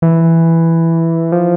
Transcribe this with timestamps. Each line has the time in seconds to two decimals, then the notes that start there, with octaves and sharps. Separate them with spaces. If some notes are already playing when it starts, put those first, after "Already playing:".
0.02 E3
1.32 F3